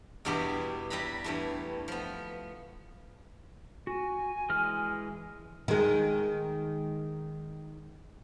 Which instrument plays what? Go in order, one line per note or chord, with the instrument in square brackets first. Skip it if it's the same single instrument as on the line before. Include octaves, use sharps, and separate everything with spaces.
[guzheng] E2 G2 B2 B3 E4 G4
G3 E4 B4 A#5 B5
G2 E3 A3
F3 B3
[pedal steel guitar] F#4 [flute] G#5
[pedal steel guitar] E3 G#3 F6
[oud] D#3 G#3